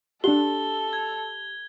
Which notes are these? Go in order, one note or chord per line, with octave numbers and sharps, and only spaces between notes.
D4 G4 A4 F#5 G7
G#6